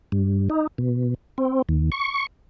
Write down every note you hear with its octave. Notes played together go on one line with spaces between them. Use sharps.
G2
D#4
B2
C4
D#2
C#6